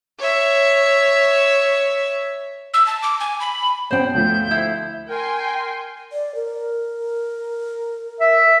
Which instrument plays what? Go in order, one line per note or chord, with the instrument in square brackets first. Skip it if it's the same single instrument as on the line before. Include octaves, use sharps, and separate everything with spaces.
[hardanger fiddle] C#5 E5
[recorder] E6
A5
D6
G#5
B5
[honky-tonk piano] B2 C#4 [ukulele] C5 G5
[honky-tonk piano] D2 F3 A3 [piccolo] G6
[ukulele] E4 C5
[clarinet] A#4 [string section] G5 G#5 C6
[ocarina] D5
A#4
[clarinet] E5